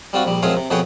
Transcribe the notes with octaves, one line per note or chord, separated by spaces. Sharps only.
G3 C4 F4 F#4
A#1 G3
F#2 F3 G#3 C4 G#4 F5
C3
F2 B2 G#4 B4 C#5 G5